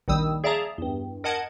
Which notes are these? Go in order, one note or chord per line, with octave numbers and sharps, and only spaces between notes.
A#1 D#2 D#3 G3 D#6 E6
G#4 D5 E5 F5 A5 A#5
E2 G2
A#4 D#5 F#5 A5 G#6